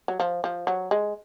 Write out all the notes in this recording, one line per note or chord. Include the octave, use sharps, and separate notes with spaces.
F#3
F3
F3
F#3
G#3